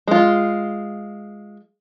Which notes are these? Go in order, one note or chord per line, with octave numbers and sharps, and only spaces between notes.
G#3 F4